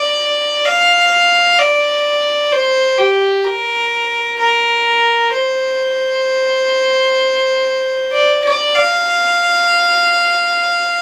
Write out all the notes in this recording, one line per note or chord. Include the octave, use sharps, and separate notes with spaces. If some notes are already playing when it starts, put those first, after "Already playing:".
Already playing: D5
F5
D5
C5
G4
A#4
A#4
C5
D5
D5
F5